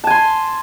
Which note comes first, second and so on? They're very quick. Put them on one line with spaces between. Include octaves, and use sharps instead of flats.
A5 G#5 C6